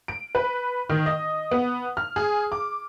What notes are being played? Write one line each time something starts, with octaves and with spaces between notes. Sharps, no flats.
D7
B4
D#3
D#5
B3
F6
G#4
D6